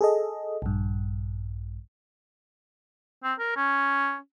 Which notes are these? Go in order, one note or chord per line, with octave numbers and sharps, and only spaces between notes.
G#4 A4 D#5
A#1 G2
C4
A#4
C#4